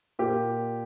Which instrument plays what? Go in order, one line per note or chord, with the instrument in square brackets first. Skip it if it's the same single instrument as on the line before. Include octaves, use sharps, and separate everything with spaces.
[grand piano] A#2 G4